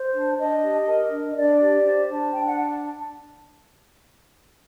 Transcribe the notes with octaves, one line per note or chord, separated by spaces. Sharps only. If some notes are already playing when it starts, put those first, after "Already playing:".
Already playing: C5
D4
D4 D#5
G4
A#4
D4
D#5
D4 D5
G4
C5
D4
D4 G5
F#5